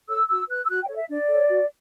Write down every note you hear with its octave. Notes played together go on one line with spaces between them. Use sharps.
A4 C#5 E6
F#4 E6
B4 F#6
E6
F#4 F#6
G5
A4 C#5
E5
D4 D5
A4 C#5
F#4